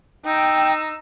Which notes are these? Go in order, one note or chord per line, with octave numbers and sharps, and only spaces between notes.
D#4 G5 E6